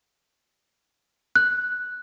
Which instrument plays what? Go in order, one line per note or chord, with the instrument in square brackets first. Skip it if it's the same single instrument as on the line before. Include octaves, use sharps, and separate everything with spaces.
[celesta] F#6